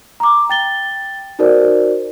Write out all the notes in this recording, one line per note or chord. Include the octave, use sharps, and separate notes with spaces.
A#5 D6
G5 A6 G7
D#4 F#4 A#4 C5 D5